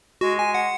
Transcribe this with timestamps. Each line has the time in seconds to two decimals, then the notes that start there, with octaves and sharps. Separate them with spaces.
0.21 G#3 F#4
0.39 G#5
0.54 F#5